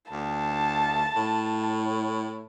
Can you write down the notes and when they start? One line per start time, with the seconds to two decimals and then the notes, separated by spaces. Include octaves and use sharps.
0.12 D2 A5
1.16 A2